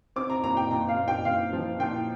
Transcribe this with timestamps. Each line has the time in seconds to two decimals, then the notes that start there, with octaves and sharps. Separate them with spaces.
0.16 C4 D6
0.30 A#5
0.44 A#2 A#5
0.57 G5
0.71 A#2 A#5
0.89 F5
0.98 A#2
1.08 G5
1.25 A#2 F5
1.53 F3
1.79 A#2 G5